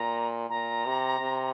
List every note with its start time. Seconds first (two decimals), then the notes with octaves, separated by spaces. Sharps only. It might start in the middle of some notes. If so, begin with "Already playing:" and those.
Already playing: A#2 A#5
0.49 A#2 A#5
0.86 C3
1.20 C3